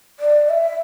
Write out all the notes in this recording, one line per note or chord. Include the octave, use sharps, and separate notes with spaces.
D5
E5